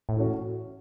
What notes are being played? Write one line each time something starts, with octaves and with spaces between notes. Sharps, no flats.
A2
E3 A3 C#4 F#4